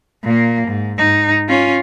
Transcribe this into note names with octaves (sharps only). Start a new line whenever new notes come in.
A#2 A#3
G#2
G#2 D#4
C#4 F4